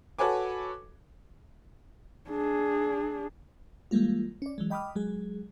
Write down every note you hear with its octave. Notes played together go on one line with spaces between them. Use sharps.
F#4 A4 B4 C#5 G#5 D6
D4 G#4
E3 G3 G#3 A#3 F4
C#4 D5
E3 F#3 G#3
D#5 G5 B5 D6 D#6 F6
F#3 G#3 G#4